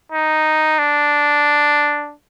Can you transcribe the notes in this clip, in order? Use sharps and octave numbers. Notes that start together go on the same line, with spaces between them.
D#4
D4